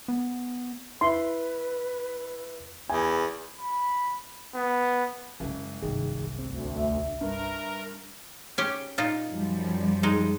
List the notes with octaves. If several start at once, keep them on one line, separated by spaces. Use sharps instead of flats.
B3
E4 B4 C6
E2 G#5
B5
B3
F#1 C#3 G#3
G1 C2 D#3 G#4
D2 C4
E5
G2 A#4
C#4 G4
A#2 D#4 F4
F#2 F3 G3
G#3 D#4